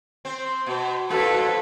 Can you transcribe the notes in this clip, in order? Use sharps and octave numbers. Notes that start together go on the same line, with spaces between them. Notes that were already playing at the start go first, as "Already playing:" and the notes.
C4
B2
F2 F#4 A4 B4